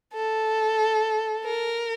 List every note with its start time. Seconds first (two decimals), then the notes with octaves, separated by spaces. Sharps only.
0.14 A4
1.45 A#4